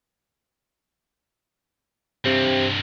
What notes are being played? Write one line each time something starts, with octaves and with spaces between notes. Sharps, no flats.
G2 C3 C4